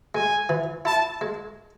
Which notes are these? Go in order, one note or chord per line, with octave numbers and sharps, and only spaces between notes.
G#3 G#5
E3
E4 A5
G#3